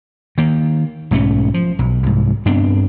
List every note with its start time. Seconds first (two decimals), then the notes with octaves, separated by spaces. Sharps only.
0.38 D#3 A#3
1.11 B1 G#2 A3 C#4
1.54 F3
1.79 B1
2.03 C2 G#2
2.46 G2 B3 C4 D4